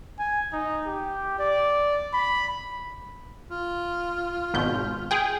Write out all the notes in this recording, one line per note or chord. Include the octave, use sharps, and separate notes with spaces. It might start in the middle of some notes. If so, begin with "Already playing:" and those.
G#5
D#4
G4
D5
B5
F4
G#1 B2 G6
G#4 G5